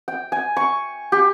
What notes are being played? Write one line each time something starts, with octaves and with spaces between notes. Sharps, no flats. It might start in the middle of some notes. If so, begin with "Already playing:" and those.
G5
G#5
C#6
G4